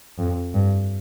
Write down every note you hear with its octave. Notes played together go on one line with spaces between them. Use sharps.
F2
G2